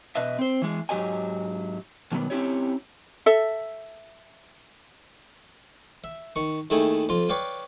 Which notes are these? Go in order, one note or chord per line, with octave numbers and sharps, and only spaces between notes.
B2 B4 D#5 E5
C4 C5
E3 G#3
G#2 F#3 G4 A#4 D#5 G#5
B2 D3 D#3 F#3 G3 B3
C4 C#4 E4 G4 C#5
A4 E5
E5
D#3 C#6
D#2 D#3 A3 E4 G#4 G5
F2 F4
B4 C#5 D5 F5 G5